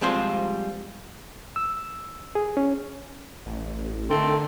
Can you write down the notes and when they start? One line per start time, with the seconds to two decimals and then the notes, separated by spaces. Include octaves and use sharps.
0.01 F3 G3 G#3 C4 F4 C5
1.56 E6
2.35 G#4
2.57 C#4
3.46 A1
4.10 D3 D#3 A3 C4 A4